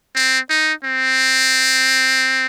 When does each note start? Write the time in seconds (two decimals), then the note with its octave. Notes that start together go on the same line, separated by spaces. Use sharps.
0.15 C4
0.49 D#4
0.84 C4